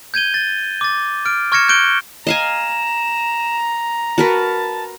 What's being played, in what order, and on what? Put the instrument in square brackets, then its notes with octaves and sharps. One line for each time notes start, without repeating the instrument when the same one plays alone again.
[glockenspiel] G6 G#6 D#7 G7
A6
D6 A6
F6 D7
C#6 F6 G#6 A#6 C#7 E7
F#6 G6 D7 G7
[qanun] D#5 F5 G#5 [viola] A#5 [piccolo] E7
[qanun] F#4 A#4 B4 [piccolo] A5